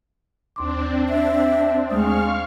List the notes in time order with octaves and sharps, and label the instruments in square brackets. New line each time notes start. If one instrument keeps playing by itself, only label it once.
[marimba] D#2 C6 D6 [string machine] C4 D4
[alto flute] E5
[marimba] D#2 A3 D#6 [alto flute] G#3 [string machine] F5 C#6 F6